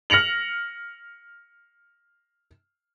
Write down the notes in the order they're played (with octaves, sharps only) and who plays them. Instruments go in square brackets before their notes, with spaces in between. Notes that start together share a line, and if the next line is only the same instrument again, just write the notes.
[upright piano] F6 A#6 C#7 F7 F#7